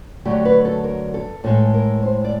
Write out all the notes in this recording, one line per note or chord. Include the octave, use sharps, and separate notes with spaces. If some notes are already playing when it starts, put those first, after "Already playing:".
D3 F#3 A3 G4
B4
A4
A#4
A4
A2 E3 G#3 A4
A#4
C5
D5